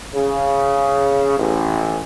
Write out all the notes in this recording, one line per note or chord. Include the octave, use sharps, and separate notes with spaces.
C#3
A1